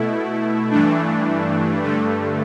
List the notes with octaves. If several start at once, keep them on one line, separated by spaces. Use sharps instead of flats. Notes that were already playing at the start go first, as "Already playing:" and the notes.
Already playing: B2 A3 E4
G2 E3 A3 D4
G2 D3 A3